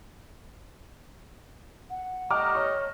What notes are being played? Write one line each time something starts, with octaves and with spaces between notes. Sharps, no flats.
F#5
G3 A3 D#5 A#5 D6 F6
C#5 C#6